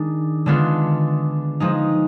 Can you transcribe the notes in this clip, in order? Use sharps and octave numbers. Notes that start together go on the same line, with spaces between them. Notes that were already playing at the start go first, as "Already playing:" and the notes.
Already playing: D#3 G#3 D4
D3 G#3 B3 D4 F4
F3 G#3 D#4